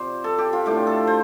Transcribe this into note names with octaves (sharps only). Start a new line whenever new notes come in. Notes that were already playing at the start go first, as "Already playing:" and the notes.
Already playing: C3 F3 C5 D5
A4
G4
F4
A2 A3 D4 G4
A4
C5